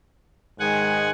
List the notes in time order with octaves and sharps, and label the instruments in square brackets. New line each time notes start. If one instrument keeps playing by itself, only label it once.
[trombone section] G#2 D#3 G#3 [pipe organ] F#5 G#5